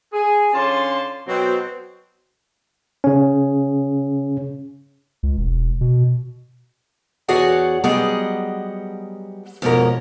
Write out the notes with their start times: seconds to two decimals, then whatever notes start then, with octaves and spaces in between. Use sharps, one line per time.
0.13 G#4
0.54 D3 C#4 F4 C#5 A5 C6
1.27 B2 F#3 C4
3.04 C#3 C#4
5.23 C#2
5.37 E1
5.81 B2
7.28 E2 F#4 G#4 C#5 D5 F#5
7.84 F#3 G3 B3 G#4 D#5 F#5
9.62 F2 G#2 B2 C#4 A#4